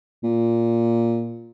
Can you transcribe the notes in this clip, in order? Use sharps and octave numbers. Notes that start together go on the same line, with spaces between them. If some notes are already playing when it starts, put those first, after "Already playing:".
A#2